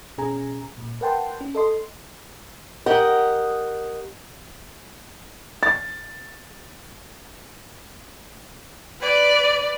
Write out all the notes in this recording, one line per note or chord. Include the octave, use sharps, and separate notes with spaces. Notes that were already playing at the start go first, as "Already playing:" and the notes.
B2 C#4 G#4 G#5 A#5
A#2
A#4 B4 F#5 G5 A5 C6
C#4
A4 D#5 C6
G4 A#4 D#5 F#5
A6
B4 D5